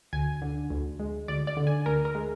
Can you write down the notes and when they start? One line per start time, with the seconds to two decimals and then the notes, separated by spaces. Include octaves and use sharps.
0.13 D2 G#5
0.42 D3
0.70 D2
1.00 G#3
1.28 D2 D5
1.47 D5
1.57 D3
1.67 G#5
1.86 D2 A#4
2.05 A#4
2.15 G#3